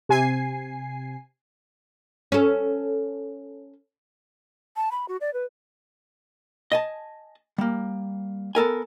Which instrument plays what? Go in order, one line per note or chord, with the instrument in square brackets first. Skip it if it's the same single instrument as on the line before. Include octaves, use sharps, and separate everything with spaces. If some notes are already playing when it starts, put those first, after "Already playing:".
[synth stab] C3 G#5 C7
[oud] C#4 A4
[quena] A5
B5
F#4
D5
B4
[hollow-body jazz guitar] D#5 G#5 A5
G3 A#3
B3 A4 A#4 G#5